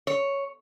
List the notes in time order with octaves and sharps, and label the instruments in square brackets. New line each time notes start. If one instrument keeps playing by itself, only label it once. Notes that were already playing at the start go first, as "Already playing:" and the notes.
[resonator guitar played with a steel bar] C#5